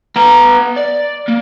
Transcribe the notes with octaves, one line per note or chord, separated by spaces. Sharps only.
B3 A#5
D5
A#3